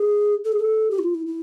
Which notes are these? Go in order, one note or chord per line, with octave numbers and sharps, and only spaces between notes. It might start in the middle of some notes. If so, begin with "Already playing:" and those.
Already playing: G#4
A4
G#4
A4
G4
E4
F4
E4
E4